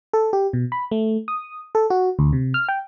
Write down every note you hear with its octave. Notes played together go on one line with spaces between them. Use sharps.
A4
G4
B2
B5
A3
D#6
A4
F#4
D2
C3
F6
G5